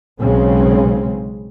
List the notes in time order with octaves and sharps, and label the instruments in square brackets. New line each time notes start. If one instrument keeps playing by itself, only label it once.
[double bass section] B1 C#3 G#3 C4